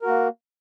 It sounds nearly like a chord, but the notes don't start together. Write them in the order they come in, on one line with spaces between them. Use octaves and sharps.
A#4 F#4 A#3